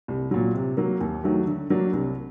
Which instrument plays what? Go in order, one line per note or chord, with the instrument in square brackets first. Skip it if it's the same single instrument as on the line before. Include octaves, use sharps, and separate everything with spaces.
[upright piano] C2
A#2 F#3
C3
F#3 A#3
D#2
D#3 F#3 A3
D3
F#3 A#3 D4
C2